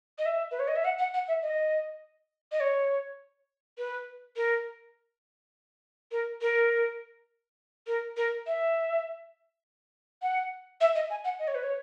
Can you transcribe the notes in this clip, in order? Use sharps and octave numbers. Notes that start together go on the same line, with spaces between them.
D#5
E5
B4
C#5
D#5
E5
F#5
F#5
F#5
E5
D#5
D#5
C#5
B4
A#4
A#4
A#4
A#4
A#4
E5
F#5
E5
D#5
G#5
F#5
D#5
C#5
B4
C#5